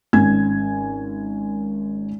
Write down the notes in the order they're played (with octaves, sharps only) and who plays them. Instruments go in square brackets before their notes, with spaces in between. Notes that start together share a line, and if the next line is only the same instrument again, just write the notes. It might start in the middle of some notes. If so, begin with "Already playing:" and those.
[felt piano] G#1 C#4 G#5 G#6